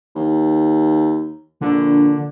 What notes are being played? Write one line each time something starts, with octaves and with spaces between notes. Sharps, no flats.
D#2
A#1 D3